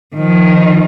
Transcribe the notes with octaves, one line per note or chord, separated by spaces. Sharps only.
D#3 F3